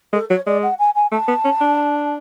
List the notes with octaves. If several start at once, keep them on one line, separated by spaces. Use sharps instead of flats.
G#3 A4
F#3 C#5
G#3 D5
F#5
G#5
G#5
A3 A5
B3
C#4
D4